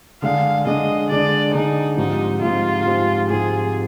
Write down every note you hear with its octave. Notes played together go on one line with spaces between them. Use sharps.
D3 G#3 D4 G#4 F5
D3 G#3 D4 G#4 D#5
D3 G#3 D4 G#4 D5
D3 G#3 D4 D#4 G#4
G#2 F3 G#3 C4 D#4 G4
G#2 F3 G#3 C4 F4 G4
G#2 F3 G#3 C4 G4
G#2 F3 G#3 C4 G4 G#4